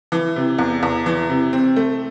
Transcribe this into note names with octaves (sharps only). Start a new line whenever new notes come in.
E3
C3
E2
E2
E3
C3
C4
A3